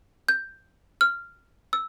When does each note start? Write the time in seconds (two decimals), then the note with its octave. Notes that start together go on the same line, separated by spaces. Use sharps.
0.29 G6
1.01 F6
1.73 E6